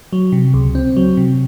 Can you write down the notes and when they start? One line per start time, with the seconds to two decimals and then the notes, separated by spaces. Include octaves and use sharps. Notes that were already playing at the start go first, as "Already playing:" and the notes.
0.13 F#3
0.32 C3
0.54 C#2
0.75 C4
0.96 F#3
1.17 C3